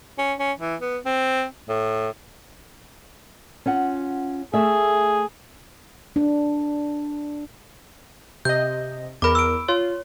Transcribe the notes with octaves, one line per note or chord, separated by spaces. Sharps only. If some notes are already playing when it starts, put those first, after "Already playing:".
C#4
C#4
E3
B3
C4
A2
C#4 F4 F#5
A3 G#4 E5
D4
C3 D#5 G6
E2 A#4 B5 D6
E6 D7
F4 C#5